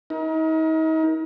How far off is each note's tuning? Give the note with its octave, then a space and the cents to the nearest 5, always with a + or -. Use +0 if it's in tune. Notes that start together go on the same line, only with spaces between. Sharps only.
D#4 +40 A#4 +25